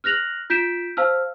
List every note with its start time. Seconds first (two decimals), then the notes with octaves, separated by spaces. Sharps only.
0.04 F6 F#6 A#6 F7 F#7
0.50 F4 G6 B6 D7 E7
0.97 C5 F5 A5 E6 F6